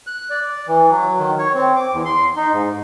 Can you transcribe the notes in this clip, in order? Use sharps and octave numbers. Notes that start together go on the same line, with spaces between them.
F#6
D5
E3
F#3
D#3
C#5
C4
D6
E2
C6
D#4
G#2